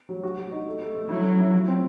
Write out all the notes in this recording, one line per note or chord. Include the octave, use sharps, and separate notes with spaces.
F#3
F#4
F#4
D#4
A3
A3
A3
F#3 E4
C#4
E4
F4
C4